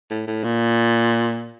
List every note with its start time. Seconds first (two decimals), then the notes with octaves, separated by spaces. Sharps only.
0.11 A2
0.28 A2
0.44 A#2